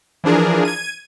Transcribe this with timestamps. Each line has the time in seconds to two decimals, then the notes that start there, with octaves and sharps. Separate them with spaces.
0.24 E3 F3 D4 G#4 A#4
0.65 G#6 D#7